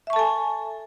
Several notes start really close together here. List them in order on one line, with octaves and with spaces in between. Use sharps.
E5 C#6 A5 A4 G#5